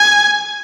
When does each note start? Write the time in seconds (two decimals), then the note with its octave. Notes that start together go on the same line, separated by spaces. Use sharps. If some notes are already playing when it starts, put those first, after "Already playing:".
Already playing: G#5